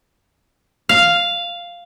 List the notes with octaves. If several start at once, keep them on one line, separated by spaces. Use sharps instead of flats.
F5